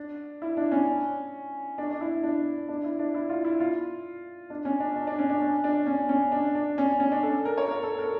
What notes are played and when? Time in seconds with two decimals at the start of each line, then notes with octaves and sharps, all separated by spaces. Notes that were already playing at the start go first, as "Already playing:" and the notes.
Already playing: D4
0.42 E4
0.57 D4
0.72 C#4
1.78 D4
1.91 D4
2.01 E4
2.23 D4
2.69 D4
2.84 E4
2.99 D4
3.15 E4
3.29 F4
3.45 E4
3.60 F4
4.50 D4
4.65 C#4
4.80 D4
4.96 D4
5.07 D4
5.19 C#4
5.30 D4
5.41 C#4
5.64 D4
5.86 C#4
6.09 C#4
6.32 D4
6.55 D4
6.78 C#4
7.00 C#4
7.12 D4
7.23 A4
7.45 A#4
7.58 C#5
7.68 A#4
7.83 A4
7.99 A#4